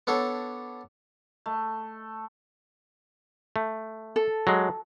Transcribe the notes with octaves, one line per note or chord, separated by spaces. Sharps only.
B3 D4 A4 C#5
A3
A3
A4
F#3 G#3